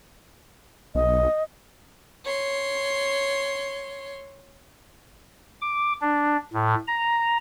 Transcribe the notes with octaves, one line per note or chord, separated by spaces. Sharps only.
B1 D#5
C#5 C6
D6
D4
A2
A#5